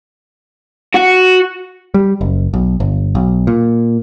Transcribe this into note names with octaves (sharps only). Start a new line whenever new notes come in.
F#4
G3
F#1
B1
G1
B1
A#2